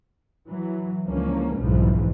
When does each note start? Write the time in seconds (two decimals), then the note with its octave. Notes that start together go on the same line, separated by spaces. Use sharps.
0.47 E3 F#3
1.06 C#2 D3 E3 F3 A#3 C#4
1.59 F#1 B1 F2 G#2 E3 F3